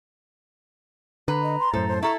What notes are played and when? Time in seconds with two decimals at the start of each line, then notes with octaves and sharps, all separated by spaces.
1.28 D3 B4 A#5
1.43 D#5
1.60 C6
1.74 F#2 A2 A4 C5
1.88 C5
2.03 E4 A4 A#5 C#6